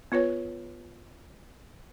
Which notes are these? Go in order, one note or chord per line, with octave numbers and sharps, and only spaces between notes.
B3 F4 B4 C#5